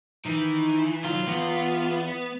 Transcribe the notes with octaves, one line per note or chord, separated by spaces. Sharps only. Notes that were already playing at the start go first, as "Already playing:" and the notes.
D#3 E3
D#3 F#3 F4
E2 B3